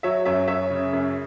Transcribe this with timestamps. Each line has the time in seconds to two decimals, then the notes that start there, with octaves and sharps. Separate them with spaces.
0.03 F#3 C#5 E5
0.25 F#2 C#5 E5
0.48 F#2 C#5 E5
0.71 C#3
0.93 F#2